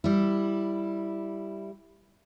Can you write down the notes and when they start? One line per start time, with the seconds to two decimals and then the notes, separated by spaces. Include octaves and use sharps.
0.04 G3 E4